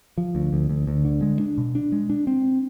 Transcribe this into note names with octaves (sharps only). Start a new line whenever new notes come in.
F3
D2
D2
D2
D2
D3
G#3
D4
B2
D4
G#3
D4
C4